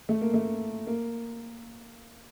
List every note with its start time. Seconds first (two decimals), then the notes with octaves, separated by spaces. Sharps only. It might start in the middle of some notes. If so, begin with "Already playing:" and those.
0.09 A3
0.21 A#3
0.34 A3
0.87 A#3